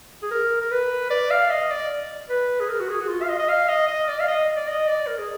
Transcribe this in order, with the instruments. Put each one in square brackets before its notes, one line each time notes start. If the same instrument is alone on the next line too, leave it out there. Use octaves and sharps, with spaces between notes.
[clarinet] G#4
A#4
A#4
B4
D5
F5
D#5
D5
B4
G#4
A#4
F#4
G#4
F#4
F4
F5
D#5
D#5
F5
D#5
D#5
D5
F5
D#5
D5
D#5
D5
A#4
G#4